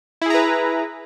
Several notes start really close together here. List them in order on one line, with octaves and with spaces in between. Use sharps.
E4 G#4 A#5 B4